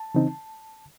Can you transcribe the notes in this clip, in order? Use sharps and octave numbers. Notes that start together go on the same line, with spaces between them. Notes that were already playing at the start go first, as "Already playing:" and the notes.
Already playing: A5
C#3 E3 C4 D#4